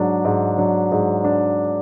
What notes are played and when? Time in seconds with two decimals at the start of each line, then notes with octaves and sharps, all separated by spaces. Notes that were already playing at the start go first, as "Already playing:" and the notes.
Already playing: G#2 F#3 D4
0.25 G#2
0.58 F#3 D4
0.92 G#2
1.24 D4